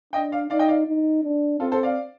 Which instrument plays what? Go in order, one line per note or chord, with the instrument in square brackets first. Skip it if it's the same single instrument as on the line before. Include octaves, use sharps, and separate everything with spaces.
[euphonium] D4 [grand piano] D#5 G5
[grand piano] D5 F5
[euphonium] D#4 [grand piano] D5 F5
[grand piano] D#5 G5
D5 F5
[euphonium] D#4
D4
[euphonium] C4 [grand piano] F4 A4
[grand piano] A4 C5
D5 F5